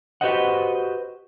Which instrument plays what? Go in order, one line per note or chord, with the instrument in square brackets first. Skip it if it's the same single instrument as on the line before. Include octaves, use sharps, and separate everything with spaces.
[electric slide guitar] F#4 G4 B4 C5 D#5 F#5